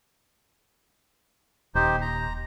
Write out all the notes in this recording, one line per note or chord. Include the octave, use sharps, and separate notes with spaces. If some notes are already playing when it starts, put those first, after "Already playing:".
D#1 D#4 G4 C5
A#5